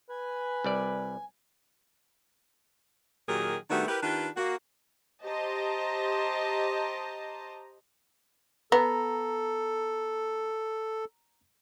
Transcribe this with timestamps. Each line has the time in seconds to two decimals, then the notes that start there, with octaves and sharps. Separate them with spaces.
0.10 B4 G#5
0.64 C2 G3 D5
3.28 A#2 D#3 F#3 G4 G#4 A#4
3.70 D#3 G3 A3 B3 D4 F#4
3.88 E4 G4 A#4 B4
4.02 D#3 D4 F4 G4 B4
4.37 A#3 F#4
5.24 G4 C5 D#5 A5 A#5
8.72 B3 A4 A#5